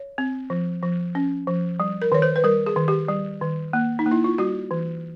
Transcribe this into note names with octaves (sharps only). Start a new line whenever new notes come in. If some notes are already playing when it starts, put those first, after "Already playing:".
Already playing: C#5
C4
F3
F3
C#4
F3
G3
A#4
D#3 C#5
C5
B4
G3 A#4
G#4
D#3
G4
G3
D#3
A#3
D#4
A#3
E4
F4
G3 F#4
E3